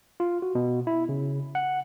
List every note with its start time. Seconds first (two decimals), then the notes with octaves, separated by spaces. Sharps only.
0.20 F4
0.42 F#4
0.55 B2
0.87 E4
1.09 C#3
1.55 F#5